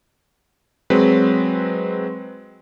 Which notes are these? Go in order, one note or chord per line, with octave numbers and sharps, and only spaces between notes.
F#3 G#3 C4 B4